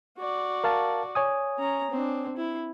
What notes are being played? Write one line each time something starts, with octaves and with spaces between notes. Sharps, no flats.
F#4 D5
A#4 F5 A5
C#5 G#5 D#6
C#4 A#5
C4 D4
E4